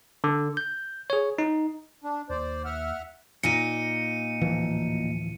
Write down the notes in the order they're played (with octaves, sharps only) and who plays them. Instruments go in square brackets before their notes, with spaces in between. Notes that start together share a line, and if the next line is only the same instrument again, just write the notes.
[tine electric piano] D3
G6
G#4 C#5
D#4
[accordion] D4
[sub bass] D#2 [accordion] C5 D5
[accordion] E5 F#5 F6
[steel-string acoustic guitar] A#2 D#4 [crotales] C#7 D#7
[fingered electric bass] D1 E3 F3